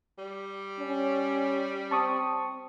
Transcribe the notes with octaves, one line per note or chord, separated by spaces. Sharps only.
G3
C#4
C4 A5 C#6 D#6